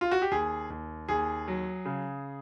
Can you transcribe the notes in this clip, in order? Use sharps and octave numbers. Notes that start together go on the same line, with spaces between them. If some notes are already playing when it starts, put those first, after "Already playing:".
F4
F#4
G4
D#2 G#4
D#2
D#2 G#4
F#3
C#3